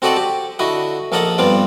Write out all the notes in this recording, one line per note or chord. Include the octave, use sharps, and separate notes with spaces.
C4 F#4 A4 D5 D#5 F#5
G4
D3 E4 F#4 D#5
A#1 A#3 A4 D#5 F#5 D#6
G2 B3 C4 F4 D5